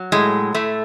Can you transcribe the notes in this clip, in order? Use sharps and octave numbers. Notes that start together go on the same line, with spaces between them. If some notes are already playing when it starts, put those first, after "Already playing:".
Already playing: F#3
A2 G#3
A2 A3